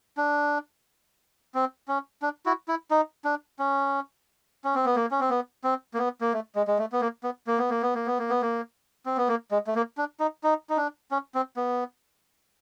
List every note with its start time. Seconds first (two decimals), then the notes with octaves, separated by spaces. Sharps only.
0.17 D4
1.55 C4
1.88 C#4
2.22 D4
2.46 E4 F#4
2.68 E4
2.91 D#4
3.25 D4
3.59 C#4
4.64 C#4
4.75 C4
4.85 B3
4.96 A#3
5.11 C#4
5.20 C4
5.30 B3
5.64 C4
5.94 A#3
5.98 B3
6.21 A#3
6.33 A3
6.55 G#3
6.68 G#3
6.79 A3
6.92 B3
7.01 A#3
7.23 B3
7.47 A#3
7.58 B3
7.70 A#3
7.82 B3
7.95 A#3
8.06 B3
8.19 A#3
8.30 B3
8.42 A#3
9.06 C4
9.17 B3
9.29 A#3
9.51 G#3
9.67 A3
9.75 A#3
9.98 D4
10.20 D#4
10.44 D#4
10.70 D#4
10.77 D4
11.11 C#4
11.35 C4
11.57 B3